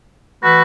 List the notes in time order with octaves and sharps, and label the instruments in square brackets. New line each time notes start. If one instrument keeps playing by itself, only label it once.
[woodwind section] E3 A3 F#4 B4